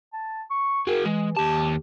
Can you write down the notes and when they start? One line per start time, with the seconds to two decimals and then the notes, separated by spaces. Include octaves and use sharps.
0.13 A5
0.50 C#6
0.87 F#4 G#4 A#4
1.06 E3 G#3
1.37 D#2 G4 A5